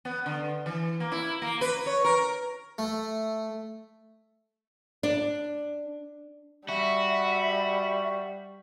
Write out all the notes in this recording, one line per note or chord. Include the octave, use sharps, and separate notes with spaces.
B3
D3
E3
A#3
E4
A#3
B4
C#5
A#4
A3
D4
G3 F#4 E5 B5